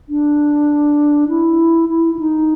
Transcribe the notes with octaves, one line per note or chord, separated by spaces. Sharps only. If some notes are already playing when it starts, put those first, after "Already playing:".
D4
E4
E4
E4
D#4